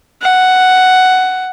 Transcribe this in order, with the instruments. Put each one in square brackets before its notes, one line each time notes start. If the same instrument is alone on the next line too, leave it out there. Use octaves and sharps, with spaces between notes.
[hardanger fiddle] F#5